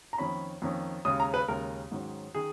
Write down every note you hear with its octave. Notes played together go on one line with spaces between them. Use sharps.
A#5
F2 D#3 A#3 C#4 B5
F2 D#3 A#3 C#4
D#2 C#3 G#3 D#6
A#5
B4
D#2 C#3 G#3 A#4
G#2 D#3 F#3 C#4
D#3 G#4